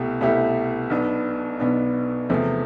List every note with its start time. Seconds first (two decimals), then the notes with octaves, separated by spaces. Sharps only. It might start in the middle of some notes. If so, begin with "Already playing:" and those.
Already playing: C2 B2 A3 E4 G4
0.21 C2 B2 A3 E4 G4
0.90 B1 B2 B3 D4
1.60 B1 B2 B3 D4
2.30 E2 C3 F3 A3